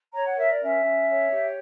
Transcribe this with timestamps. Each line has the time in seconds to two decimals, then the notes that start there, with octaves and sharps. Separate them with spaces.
0.13 C#5 A#5
0.25 F#5
0.36 A#4 E5
0.48 D5
0.60 C#4 E5
0.83 C#4
1.07 C#5
1.30 G4